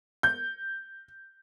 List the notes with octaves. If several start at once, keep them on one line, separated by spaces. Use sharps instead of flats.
G6